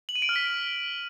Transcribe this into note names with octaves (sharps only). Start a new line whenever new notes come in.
F#7
D#7
D7
F6
B6